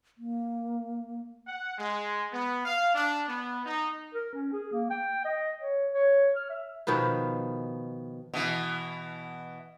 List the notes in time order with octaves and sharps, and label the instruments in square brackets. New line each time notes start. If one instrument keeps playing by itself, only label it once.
[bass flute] A#3
[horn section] F#5
G#3
B3
F5
D4
B3
D#4
[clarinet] A#4
C#4
G#4
A#3
G5
D#5
C#5
C#5
F6
E5
[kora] B2 D#3 F3 B4
[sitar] B2 E3